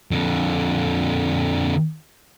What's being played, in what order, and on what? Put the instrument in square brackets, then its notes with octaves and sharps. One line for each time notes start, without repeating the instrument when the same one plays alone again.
[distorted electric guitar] F2 D3